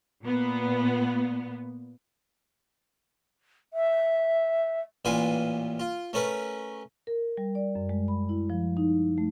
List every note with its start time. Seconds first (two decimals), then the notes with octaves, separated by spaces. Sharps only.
0.23 A#2 B3
3.73 E5
5.05 A1 A#2 F4 B4 G#5
5.80 F4
6.13 A3 C#4 A#4 B4
7.07 A#4
7.37 G3
7.55 D5
7.75 F#2
7.89 G#3
8.08 B5
8.29 E4
8.50 F3
8.77 D#4
9.18 A3